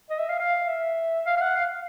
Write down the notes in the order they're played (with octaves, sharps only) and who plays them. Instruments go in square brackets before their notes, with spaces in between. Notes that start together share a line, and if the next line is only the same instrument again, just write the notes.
[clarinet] D#5
E5
F5
F5
E5
F5
F5
F#5
F5